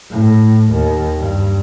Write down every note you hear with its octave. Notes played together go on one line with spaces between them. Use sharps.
A2
D#2
G2